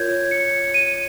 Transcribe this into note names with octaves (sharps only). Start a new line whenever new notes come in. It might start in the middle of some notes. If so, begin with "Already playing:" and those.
Already playing: F4 A#4 C#5 G6 G#6
C#7
D#7